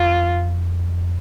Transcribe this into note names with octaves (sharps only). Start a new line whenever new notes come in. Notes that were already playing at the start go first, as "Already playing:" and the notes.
Already playing: F2 F4